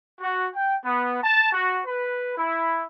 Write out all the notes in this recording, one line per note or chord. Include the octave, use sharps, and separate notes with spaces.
F#4
G5
B3
A5
F#4
B4
E4